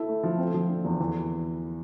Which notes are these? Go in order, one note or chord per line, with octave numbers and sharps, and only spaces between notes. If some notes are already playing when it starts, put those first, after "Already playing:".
Already playing: E4 A4
A3
F3
C4
F3
D3
E2
E3